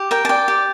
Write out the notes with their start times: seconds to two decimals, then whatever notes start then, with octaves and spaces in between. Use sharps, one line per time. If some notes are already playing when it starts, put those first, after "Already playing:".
Already playing: G4
0.11 A#4 G5
0.25 A5
0.29 D5 G5
0.48 G4